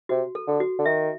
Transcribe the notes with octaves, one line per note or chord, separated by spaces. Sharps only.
C3 F#4
A4
D3
F#4
D3
D#3 E5